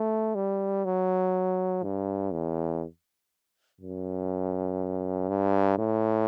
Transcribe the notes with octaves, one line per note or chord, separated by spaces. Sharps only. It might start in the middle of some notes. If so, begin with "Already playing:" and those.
Already playing: A3
G3
F#3
G2
E2
F#2
G2
A2